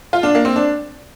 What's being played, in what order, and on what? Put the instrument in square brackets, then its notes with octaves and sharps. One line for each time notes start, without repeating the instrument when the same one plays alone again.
[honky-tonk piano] F4
D4
A#3
C4
D4